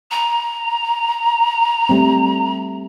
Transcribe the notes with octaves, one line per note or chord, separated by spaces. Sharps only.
A#5
G3 A3 C4